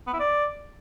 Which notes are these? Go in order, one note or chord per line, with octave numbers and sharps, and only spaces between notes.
B3
E4
D5